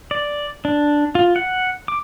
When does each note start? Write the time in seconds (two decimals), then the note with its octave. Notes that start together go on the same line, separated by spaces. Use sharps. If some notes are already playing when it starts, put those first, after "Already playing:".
0.11 D5
0.65 D4
1.15 F4
1.36 F#5
1.88 D6